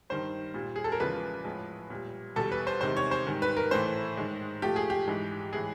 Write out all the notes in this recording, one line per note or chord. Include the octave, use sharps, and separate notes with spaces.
G2 D#3 G3 C5
A#2 G3
G#4
A4
A#4
E2 C#3 F3 G#3 B4
A2 F3 G#3
A#2 G3
E2 B2 G3 A4
B4
C5
E2 C3 D#3 G#3 C5
C#5
C5
G#2 D#3 G3
B4
A#4
A2 E3 A3 C5
G#2 D#3 G#3
A#2 F3 A3 G4
G#4
G4
G#2 E3 G#3
A2 E3 G#3 G#4